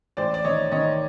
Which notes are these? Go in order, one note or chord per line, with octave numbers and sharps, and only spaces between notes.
A1 C5 D5
D5
D#3 C#5 D#5
D#3 C#5 D#5